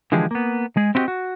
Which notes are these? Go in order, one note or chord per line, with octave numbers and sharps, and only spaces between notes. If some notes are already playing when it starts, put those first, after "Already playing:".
D3 E3 F3 G#3 G4 G#4
A#3 B3
G#3 G#4
C4 E4 F#4 G4 D#5
F#4